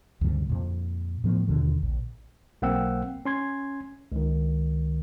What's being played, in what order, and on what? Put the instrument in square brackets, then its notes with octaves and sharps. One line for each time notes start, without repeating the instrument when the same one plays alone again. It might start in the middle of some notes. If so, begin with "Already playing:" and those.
[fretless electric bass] D2 G2 C#3 G3
F2 A#2
A2 F3 B3
D#2 B2 D3
A#1
[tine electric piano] B1 A#3 C4 F#5 G5 E6
C#4 C6 G#6
C#2 D#3